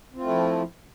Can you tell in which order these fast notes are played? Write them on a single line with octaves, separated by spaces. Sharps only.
C4 F4 A3 E4 F3